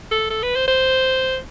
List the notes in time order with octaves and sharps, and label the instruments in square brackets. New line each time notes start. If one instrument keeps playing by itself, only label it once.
[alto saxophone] A4
A4
B4
C5
C5